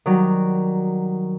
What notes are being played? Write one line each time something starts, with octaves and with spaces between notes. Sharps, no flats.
D#3 F#3 G3